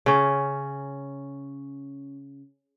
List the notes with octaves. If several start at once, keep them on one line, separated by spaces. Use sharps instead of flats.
C#3 C#4